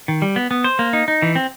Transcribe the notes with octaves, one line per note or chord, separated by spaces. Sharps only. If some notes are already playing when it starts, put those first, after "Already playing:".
D#3
G3
B3
B3
C5
A#3
D#4
D#4
E3
C4